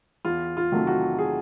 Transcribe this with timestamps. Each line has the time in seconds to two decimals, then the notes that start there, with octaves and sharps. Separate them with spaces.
0.25 E2 F4
0.57 F4
0.72 C3 D#3 F#3 A3
0.87 F#4
1.19 G#4